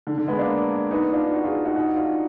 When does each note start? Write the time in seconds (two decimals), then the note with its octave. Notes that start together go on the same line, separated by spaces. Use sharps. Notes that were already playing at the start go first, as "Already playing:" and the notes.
0.07 D3
0.17 D3
0.28 G#3 B3
0.39 A#3 D4
0.91 B3 D#4
1.13 D4 F4
1.34 D#4 F#4
1.44 F4 G#4
1.65 D#4 F#4
1.76 D#4 F#4
1.96 D4 F4